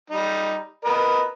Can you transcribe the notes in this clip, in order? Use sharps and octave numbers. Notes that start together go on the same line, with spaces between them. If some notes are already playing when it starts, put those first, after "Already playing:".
G3 D#4
A#4 B4 D#5